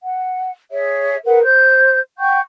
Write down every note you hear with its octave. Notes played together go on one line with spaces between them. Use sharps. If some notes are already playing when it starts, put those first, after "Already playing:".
F#5
G#4 C#5 E5
G#4 A#4 B4 F#5
C5 G6
F#5 G5 C#6 G6